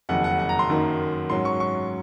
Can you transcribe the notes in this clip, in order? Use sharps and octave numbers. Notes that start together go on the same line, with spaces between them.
F#1 F2 D#3 F#3 F#5
F#5
F#5
A#5
C6
F#2 D#3 F#3 A#3 D#4
G#2 F#3 C#4 C6
C#6
C#6